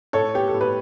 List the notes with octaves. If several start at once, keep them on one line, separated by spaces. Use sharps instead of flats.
A2 A4 C#5
B3 G4
A4
A2
B4